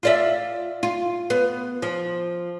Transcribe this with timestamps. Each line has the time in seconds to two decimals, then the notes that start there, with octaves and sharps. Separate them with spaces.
0.03 F4 D5 E5
0.83 F4
1.30 B3
1.82 F3